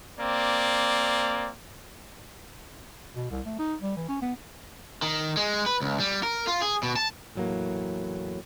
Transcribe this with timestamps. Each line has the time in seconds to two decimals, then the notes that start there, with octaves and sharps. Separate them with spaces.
0.19 A#3 C4 D5
3.16 B2
3.31 C2
3.46 A3
3.59 D#4
3.81 G3
3.97 E3
4.08 C#4
4.22 B3
5.02 D#3
5.37 G#3
5.66 B4
5.82 C#2
6.00 G3
6.23 A#4
6.47 F4
6.62 G#4
6.83 B2
6.96 A5
7.36 E2 A2 F#3 A3 A#3